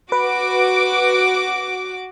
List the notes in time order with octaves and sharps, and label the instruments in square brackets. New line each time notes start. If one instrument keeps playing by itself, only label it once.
[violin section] F#4 D6 [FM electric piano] B4